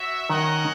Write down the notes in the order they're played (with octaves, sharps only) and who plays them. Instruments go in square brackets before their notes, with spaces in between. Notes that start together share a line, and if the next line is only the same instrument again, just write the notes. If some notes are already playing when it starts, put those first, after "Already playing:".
Already playing: [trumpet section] F#4 C#5 E5
[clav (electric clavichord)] D#3 [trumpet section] C#4 F#4 A#4 D#5 F#5